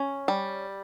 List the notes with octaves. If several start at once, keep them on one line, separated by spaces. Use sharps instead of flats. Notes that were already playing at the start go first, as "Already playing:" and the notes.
Already playing: C#4
G3